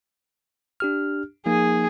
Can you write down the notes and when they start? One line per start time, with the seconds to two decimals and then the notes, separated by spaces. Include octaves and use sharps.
0.80 D4 G4 F6
1.46 F3 A#3 D#4 G#4